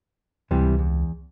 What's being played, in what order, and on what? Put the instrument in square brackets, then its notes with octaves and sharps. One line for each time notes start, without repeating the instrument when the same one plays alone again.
[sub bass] C#2 [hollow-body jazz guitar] C3 E3 G3
[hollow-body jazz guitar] E2